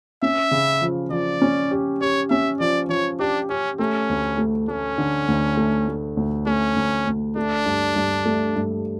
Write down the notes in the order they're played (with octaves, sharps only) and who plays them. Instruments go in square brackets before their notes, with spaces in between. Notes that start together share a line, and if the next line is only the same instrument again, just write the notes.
[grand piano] C#4 [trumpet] E5
[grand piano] C#3
F3
[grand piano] F3 [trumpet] D5
[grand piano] C#4
G4
[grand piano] G4 [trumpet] C#5
[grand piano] C#4 [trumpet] E5
[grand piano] F3 [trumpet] D5
[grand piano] F3 [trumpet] C#5
[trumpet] D4 [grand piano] G4
[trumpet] C#4 [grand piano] G4
[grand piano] A3 [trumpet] C#4
[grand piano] D2
A3
[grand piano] A3 [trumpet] C#4
[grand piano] D3
D2
A3
A3
D2
[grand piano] A3 [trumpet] C#4
[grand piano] D2
D2
[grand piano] A3 [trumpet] D4
[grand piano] G2
G2
A3
G2